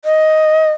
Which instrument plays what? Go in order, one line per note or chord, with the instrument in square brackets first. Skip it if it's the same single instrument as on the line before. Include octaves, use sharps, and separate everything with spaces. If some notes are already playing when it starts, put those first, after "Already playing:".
[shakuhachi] D#5